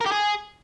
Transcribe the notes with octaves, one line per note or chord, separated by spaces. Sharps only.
A#4
G4
G#4